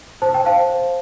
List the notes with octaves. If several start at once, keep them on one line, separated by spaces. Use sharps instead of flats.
C5 A5
G5
C5 F5 A5
C5